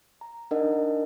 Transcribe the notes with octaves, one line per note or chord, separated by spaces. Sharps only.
A#5
D4 D#4 A#4 D#5 F#5